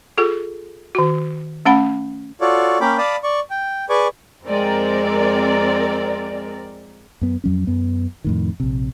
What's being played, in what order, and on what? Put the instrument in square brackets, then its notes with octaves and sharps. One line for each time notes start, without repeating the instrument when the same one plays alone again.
[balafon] F4 G#4 A4
D#3 F#4
A3 C#4 F#5 B5
[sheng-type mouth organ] F4 F#4 A4 C#5 D5
A#3 C#4 A#4 G5 B5 D6
D5 F5 A5 B5 D6 D#6
D5 C#6
G5
G#4 B4 D5 G#5 C#6 D6
[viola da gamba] F2 G#3 [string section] C4 A#4 D5
[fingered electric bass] F#2 B3
F2 F#3 C#4
F#2 B3
F2 A2 D#3
A#1 C3